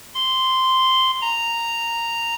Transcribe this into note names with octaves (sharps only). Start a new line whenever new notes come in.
C6
A#5